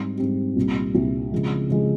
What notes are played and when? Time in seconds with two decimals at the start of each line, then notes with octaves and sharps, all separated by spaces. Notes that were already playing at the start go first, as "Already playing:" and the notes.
Already playing: G#2 G3 C4 G4
0.18 G#2 G3 C4 G4
0.56 C2 A#2 G3
0.95 C2 A#2 G3
1.32 C#3 F3 G#3
1.69 C#3 F3 G#3